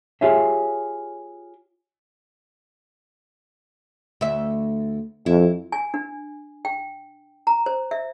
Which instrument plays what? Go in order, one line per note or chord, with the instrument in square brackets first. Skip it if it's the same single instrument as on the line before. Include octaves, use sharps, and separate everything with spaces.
[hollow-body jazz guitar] F4 G4 G#4 C#5 E5
[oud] D2 E5
[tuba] F2 [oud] E4
[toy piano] G#5
D4
G5
A#5
C5
E5